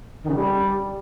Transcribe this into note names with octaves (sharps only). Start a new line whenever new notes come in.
D#3
C#3
G3